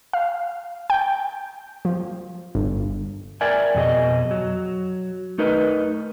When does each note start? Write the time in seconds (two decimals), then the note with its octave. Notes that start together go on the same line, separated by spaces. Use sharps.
0.13 F5
0.90 G5
1.85 F3
2.55 G1
3.41 A#4 D5 E5 G5 G#5
3.75 F2 B2 G#4 D#5
4.31 F#3
5.38 A3 D#4 A#4 B4 D#5